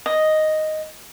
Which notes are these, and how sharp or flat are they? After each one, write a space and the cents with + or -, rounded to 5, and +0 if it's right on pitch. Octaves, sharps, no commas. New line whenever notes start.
D#5 +0